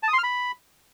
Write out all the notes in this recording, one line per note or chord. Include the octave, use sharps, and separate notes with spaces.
A5
D#6
C6
F6
B5